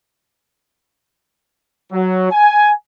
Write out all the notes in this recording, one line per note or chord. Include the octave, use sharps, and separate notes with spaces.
F#3
G#5